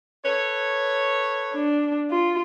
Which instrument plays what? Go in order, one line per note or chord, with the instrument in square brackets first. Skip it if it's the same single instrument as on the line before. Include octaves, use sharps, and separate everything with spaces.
[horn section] A4 B4 C#5
[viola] D4
F4